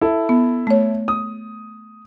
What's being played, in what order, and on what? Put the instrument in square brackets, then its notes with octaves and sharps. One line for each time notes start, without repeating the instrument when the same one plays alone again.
[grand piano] E4 A4
[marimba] B3
A3 C#5
[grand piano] D#6